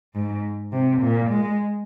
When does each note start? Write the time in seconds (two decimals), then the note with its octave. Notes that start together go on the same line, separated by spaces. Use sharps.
0.14 G#2
0.72 C3
1.01 A#2
1.30 G#3